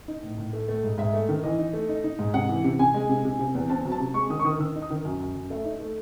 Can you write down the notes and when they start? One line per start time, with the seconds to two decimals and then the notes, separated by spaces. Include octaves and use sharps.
0.08 D#4
0.23 A2
0.38 A2
0.53 A3
0.68 A3
0.83 G#2
0.98 G#2 E5
1.14 A3
1.29 D#3
1.44 E3 D#5
1.58 D#4
1.73 A3
1.89 D#4
2.04 D#4
2.19 G#2
2.34 C3 F#5
2.49 E3
2.64 C3
2.79 C3 G#5
2.94 G#3
3.09 C3
3.25 C3
3.39 C3
3.55 E2
3.70 C4 A5
3.85 F#3
3.92 A5
4.00 C3
4.14 G#3 C#6
4.30 D#3 D#6
4.39 C#6
4.44 D#3 D#6
4.59 D#3 E6
4.76 D#4
4.82 D#6
4.90 D#3
5.05 F#2
5.20 F#2
5.35 F#2
5.50 A3 E5
5.65 D#4
5.80 A3